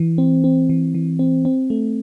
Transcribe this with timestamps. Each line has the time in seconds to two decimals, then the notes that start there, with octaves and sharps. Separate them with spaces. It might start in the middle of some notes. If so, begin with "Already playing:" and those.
Already playing: E3
0.18 C4
0.44 C4
0.69 E3
0.94 E3
1.19 C4
1.45 C4
1.70 A3